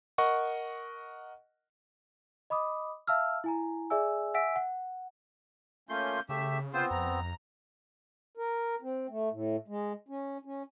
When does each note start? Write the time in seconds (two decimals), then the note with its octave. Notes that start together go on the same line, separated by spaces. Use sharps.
0.18 A#4 D#5 F#5 C#6
2.50 D#5 B5 D6 D#6
3.07 E5 F5 A5 E6 F6
3.44 E4 G#5 A#5
3.90 G#4 D5 E5 G#5 E6
4.34 E5 F#5 G#5 E6 B6 D7
4.56 F#5
5.89 A3 A#3 C#4 F4 C6 G6
6.29 C#3 A3 G4 E5
6.73 B3 C4 F4 C5
6.91 F2 A#5
8.37 A#4
8.82 C4
9.09 A3
9.31 A2
9.68 G#3
10.08 C#4
10.45 C#4